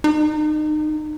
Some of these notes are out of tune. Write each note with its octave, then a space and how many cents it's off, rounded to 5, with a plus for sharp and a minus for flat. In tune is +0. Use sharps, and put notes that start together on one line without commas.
D#4 -30